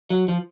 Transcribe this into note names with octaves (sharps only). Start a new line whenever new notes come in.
F#3
F3